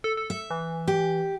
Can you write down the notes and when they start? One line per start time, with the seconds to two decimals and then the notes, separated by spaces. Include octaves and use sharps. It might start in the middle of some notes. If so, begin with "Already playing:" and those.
0.04 A4
0.17 A4
0.30 E5
0.50 E3
0.88 G4